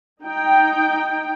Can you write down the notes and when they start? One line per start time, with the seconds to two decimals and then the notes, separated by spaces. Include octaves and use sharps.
0.22 D#4 G5